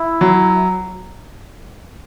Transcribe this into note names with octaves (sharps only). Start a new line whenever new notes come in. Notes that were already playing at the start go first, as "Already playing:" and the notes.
Already playing: E4
F#3